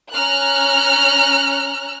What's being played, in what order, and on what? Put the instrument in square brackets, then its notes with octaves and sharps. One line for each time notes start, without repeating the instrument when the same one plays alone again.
[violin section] C#4 A#5 F6 F#6